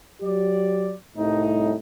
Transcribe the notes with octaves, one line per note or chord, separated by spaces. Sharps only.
F#3 G4 D5
C2 A2 D#4